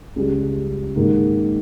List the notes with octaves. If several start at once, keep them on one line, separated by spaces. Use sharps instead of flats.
C#2 C#3 G3
G#2 D#3 A#3